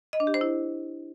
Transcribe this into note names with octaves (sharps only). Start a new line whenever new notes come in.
D#5
D4
G4
C5
E4